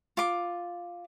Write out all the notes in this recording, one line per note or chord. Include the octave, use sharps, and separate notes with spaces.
F4 D6